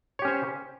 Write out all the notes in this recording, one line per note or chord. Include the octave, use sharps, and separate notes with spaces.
C#4 G4 C5 C#5